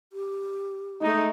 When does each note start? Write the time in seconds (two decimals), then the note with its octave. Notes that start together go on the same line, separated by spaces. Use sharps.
0.13 G4
1.02 G#3 A3 D#4